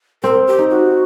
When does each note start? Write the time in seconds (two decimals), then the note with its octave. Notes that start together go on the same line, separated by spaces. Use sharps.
0.23 C4 A#4
0.47 G4
0.59 D#4
0.70 F#4